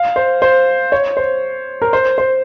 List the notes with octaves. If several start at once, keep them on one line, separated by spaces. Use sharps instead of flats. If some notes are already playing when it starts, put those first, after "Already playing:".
Already playing: F5
C5
C5
C#5
C5
A#4
C5
C5